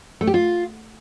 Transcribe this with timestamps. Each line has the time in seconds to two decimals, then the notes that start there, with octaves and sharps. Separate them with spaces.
0.21 A3
0.27 G4
0.34 F4